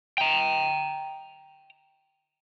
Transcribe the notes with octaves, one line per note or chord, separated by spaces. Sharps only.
G5 A#5